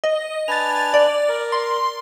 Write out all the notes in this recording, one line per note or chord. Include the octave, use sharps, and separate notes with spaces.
D#5
D4 B4 G#5 A6 F7
D5
A#4
C6